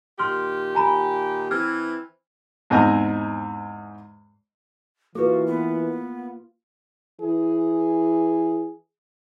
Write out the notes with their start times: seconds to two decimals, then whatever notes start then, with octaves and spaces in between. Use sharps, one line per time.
0.19 A#2 D#3 G4 C6 F6
0.75 G#5 A#5 B5
1.51 E3 C4 F6 G#6
2.70 E2 G#2 C4 D#5 G#5 A#5
5.15 E3 A#3 F4 F#4 A4 B4
5.47 B3
7.21 E3 G#4